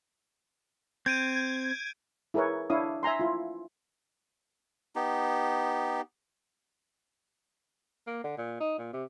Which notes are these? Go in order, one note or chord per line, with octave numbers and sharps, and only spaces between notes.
C4 G6 G#6 D7 D#7
E4 G#4 A#4 B4 C#5
D4 E4 C#5 F5 D#6
E5 G#5 A#5 C6
E4 F4
B3 D#4 G4
A#3
D3
A#2
D#4
A#2
C3